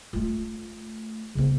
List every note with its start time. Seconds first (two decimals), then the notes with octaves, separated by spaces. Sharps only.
0.13 A3 F4
1.35 C#3 B3